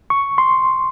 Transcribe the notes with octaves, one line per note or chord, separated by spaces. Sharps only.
C#6
C6